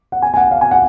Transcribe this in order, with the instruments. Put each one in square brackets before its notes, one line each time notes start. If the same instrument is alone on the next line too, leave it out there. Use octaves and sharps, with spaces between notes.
[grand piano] F#5
G#5
G#5
F#5
F5
G#5
F#5